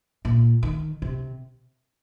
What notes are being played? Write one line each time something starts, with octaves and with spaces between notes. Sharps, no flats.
A#2
D#3
C3